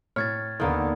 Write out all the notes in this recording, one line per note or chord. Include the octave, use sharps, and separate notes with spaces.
A2 C#5 C#6 F6 G#6 A6
D#2 D3 D#3 A#3 B3